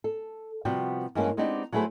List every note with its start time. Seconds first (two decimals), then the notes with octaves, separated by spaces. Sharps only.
0.04 A4
0.65 C3 F3 G3 B3 F#4 G5
1.15 G2 E3 G#3 A#3 C#4
1.37 G#3 B3 C4 D4 D#4 G4
1.72 F#3 A3 E4 G#4 B4 C5